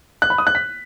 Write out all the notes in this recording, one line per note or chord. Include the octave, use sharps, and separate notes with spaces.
F#6
B5
D#6
F#6
B6